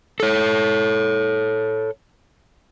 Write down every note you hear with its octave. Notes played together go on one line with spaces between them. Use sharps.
A4 C#5